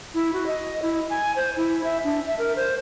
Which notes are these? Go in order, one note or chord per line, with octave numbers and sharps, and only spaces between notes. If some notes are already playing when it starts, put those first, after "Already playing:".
E4
F#4
D#5
E4
G#5
C5
E4
E5
D4
E5
A#4
C5